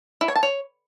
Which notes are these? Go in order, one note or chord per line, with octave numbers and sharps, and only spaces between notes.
E4
C#5
A5
C#5